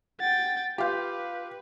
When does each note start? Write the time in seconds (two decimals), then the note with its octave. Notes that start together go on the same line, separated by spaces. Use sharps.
0.20 F#5 G5 A6
0.78 F4 G4 B4 F5 C6 G6